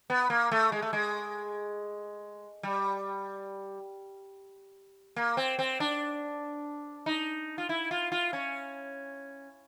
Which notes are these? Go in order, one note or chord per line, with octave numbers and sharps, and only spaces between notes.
B3
A#3
A3
G#3
A3
G#3
G3
A#3
C4
C4
D4
D#4
F4
E4
F4
F4
C#4